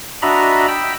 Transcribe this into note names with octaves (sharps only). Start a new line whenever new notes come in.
D4 F#4 D#5 E5 A#5 B5
G5 B5 E6